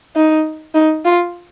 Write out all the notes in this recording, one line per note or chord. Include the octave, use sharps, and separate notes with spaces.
D#4
D#4
F4